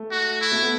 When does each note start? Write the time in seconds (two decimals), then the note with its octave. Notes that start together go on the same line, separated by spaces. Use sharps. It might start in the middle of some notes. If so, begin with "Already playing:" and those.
Already playing: A3
0.11 F#4
0.41 E4
0.52 A3
0.62 B3